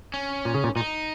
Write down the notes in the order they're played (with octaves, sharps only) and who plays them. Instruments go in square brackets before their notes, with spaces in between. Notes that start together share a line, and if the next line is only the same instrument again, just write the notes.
[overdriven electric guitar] C#4
[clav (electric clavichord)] A#2
C#3
A#2
[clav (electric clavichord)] A#2 [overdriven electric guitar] D#4